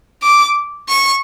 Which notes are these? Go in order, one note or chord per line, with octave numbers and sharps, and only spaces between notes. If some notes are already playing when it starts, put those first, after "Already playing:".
D6
C#6